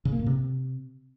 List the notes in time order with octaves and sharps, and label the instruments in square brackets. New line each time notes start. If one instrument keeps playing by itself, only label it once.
[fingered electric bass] C#3
A#3
A2
C3